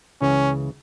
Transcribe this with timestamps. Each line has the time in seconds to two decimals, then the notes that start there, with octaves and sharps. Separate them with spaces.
0.21 C#2 C#3 E3 C#4